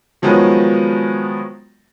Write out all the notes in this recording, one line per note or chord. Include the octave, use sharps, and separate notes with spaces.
D#3 F3 F#3 G#3 B3 C#4